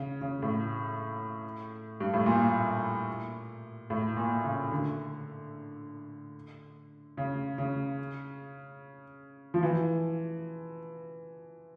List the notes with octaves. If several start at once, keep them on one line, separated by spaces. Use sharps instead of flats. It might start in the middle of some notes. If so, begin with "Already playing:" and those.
Already playing: C#3
C#3
A2
G2
A2
A#2
A2
A#2
C#3
D3
C#3
C#3
F3
E3